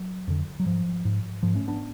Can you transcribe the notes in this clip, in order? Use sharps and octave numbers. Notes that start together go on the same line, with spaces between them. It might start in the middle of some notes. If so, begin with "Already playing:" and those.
Already playing: F#3
F2 D3
F#3
G#2 F3
G#2
G#2 F3
A3 C#4
B3 D4